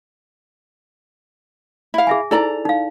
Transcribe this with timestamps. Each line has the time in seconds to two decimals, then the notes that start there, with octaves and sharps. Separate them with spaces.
1.94 E4 F5
2.07 G#4 E5 G#5
2.31 D#4 E4 A4 C5 D5 A#5
2.65 D#4 F5